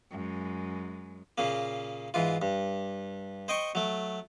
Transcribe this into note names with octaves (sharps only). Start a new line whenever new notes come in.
F#2 G#3
A#2 C#3 A#3
G#2 E3 F4
G2
C5 D#5 G5 C#6
F#3 A3